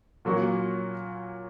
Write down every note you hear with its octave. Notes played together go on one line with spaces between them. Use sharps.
A#2 F#3 A#3 C#4 F#4